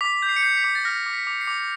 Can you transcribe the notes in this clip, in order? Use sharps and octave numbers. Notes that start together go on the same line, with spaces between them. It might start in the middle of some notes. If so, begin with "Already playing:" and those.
D6 B6
G6
C7
C#7
G6 C7
B6
D6
A6
F6 A#6
D6
B6
D6
C7
D6